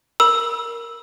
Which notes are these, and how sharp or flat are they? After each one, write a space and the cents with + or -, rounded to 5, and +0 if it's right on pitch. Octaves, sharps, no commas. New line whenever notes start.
A#4 +0 B5 -30 E6 +0